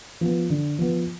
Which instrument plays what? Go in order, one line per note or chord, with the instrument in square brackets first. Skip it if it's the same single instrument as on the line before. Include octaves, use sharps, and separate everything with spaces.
[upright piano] F3 B3
D3
F3 B3